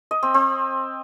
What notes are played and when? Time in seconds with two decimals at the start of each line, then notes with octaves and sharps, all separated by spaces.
0.11 D#5
0.23 C4
0.34 C4